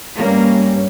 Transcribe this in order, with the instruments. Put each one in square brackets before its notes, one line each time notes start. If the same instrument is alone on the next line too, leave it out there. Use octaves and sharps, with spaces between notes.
[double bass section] G2 G3 C#4 [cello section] A#3